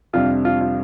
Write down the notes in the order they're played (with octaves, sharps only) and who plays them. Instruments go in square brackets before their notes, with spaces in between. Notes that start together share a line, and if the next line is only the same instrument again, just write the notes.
[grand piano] F2 C3 G3 D4 [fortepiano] F4
[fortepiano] F4
F4